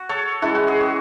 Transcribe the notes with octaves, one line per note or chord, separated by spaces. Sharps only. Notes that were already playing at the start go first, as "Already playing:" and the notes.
Already playing: F#4
A4 C#5
E3 G#3 C#4 E4 F#4 A4
F#4
G#4
F#4